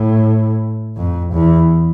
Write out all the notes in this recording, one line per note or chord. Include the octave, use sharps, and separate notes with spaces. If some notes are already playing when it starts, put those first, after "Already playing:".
Already playing: A2
F2
E2